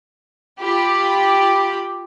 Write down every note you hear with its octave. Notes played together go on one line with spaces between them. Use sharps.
F4 G4 B5